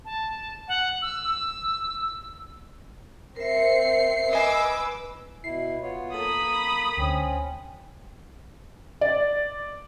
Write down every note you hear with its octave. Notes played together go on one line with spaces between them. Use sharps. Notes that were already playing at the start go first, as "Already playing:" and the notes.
A5
F#5
E6
C4 A#4 E5 C7 C#7
B4 D#5 G#5 D6 E6 C7
B2 E4 C7
B3 F4 C#5
A#3 A4 B5 D#6
D2 C4 C#4
D5